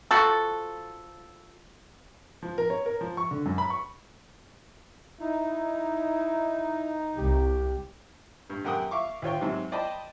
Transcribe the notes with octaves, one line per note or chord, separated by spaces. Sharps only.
F3 F#4 A4
F3
A#4
C#5
A#4
F3
C#6
D3
F#2
B5
C#6
D#4 E4
C2 G4
G2
F#2 G4 A#4 F#5 G5 D#6
E5 F5 C#6 D6
D2 F4 C#5 G5
G#2 C3 F#3
C5 D5 D#5 G5 A5 B5